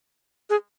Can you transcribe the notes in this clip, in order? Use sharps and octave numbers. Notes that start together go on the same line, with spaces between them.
G#4